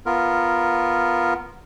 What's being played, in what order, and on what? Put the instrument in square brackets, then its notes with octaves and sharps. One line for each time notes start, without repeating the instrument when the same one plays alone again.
[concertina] B3 F4 A#4